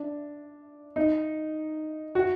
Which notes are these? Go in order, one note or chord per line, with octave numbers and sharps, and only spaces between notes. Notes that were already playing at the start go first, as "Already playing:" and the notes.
Already playing: D4
D#4
F#4